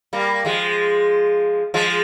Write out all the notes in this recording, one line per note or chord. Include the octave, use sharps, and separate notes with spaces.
G3 A#3
F3 G#3
F3 G#3